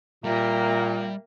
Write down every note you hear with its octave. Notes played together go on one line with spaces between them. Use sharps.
A#2 G3 A#3 E5 G5 A#5